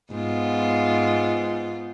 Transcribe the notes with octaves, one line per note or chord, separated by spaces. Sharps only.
G#2 B3 F4